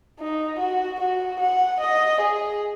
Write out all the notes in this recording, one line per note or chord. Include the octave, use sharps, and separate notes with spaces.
D#4
F#4
F#4
F#5
D#5
G#4